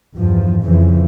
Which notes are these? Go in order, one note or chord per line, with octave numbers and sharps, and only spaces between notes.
E2 G2 F3
F2 C#3 E3 F3